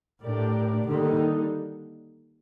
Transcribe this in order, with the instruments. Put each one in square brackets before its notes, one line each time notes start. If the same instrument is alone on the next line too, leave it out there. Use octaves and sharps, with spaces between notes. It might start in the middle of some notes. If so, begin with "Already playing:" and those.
[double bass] A2 [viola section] A3 D4 G4 A#4 D5
[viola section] D3 G3 A#3 D#4 A4 [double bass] D#3